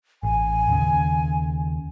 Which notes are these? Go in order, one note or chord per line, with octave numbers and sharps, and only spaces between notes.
A1 G#5
D#2 C#3